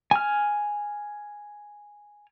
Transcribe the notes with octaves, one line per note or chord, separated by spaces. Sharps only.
G#5 F6